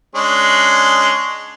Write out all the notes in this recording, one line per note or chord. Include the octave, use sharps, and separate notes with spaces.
G#3 C#4 D4